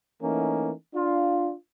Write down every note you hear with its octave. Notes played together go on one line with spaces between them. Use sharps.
E3 A3 A#3 C#4 D#4
D4 F4